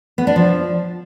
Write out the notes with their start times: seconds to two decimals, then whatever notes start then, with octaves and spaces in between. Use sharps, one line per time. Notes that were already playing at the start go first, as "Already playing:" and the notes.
0.18 B3
0.27 D4
0.36 F3